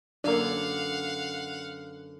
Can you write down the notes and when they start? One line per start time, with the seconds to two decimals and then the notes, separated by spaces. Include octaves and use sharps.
0.24 F#2 D3 A#3 B3 D4 F5 F#5